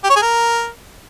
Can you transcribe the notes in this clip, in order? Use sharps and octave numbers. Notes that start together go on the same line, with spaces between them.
G4
C#5
G#4
A#4